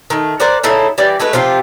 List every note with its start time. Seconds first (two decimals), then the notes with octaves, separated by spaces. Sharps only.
0.10 D#3 A3
0.40 A#4 C5 D5 F#5
0.63 C#3 A3 D#4 E4
0.98 E3 G3 D5
1.20 G#3 A3 F#4 B4
1.33 C3 F3 F4 G4